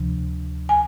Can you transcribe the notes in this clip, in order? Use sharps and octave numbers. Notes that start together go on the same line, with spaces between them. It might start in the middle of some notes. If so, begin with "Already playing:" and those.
Already playing: D2 C3 F3
G#5